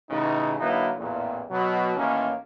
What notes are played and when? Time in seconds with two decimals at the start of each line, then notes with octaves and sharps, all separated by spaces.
0.10 A1 C#3 D#4
0.60 D3 F#3 A#3 D#4 E4 B4
0.98 A1 E2 A#2
1.50 B2 F#3
1.96 A1 D#3 A#3 C#4